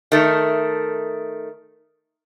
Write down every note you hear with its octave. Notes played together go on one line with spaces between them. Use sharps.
D#3 A3